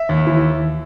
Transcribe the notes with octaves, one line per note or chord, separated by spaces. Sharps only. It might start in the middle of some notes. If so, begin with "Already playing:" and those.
Already playing: E5
D#2
E3